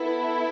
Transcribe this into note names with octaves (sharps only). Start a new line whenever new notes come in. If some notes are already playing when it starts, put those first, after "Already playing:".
Already playing: B3 E4 A4